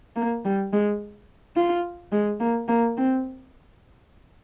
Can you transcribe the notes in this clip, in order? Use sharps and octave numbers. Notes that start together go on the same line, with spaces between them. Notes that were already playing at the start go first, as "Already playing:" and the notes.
A#3
G3
G#3
F4
G#3
A#3
A#3
C4